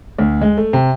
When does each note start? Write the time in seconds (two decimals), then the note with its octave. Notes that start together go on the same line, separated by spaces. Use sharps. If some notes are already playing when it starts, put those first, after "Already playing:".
0.19 D2
0.41 G#3
0.57 A3
0.73 C3